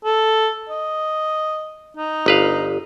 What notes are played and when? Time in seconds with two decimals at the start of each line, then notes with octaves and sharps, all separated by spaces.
0.05 A4
0.69 D#5
1.97 D#4
2.26 G1 B4 F5